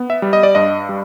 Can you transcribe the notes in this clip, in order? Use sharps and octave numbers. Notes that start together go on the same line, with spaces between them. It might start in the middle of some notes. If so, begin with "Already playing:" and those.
Already playing: B3
E5
G3
D#5
D5
G2 D#5
G3